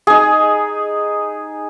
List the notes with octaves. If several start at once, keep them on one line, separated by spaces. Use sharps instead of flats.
D#4 G#4